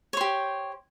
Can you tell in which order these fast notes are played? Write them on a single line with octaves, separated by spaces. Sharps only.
C#5 C5 G4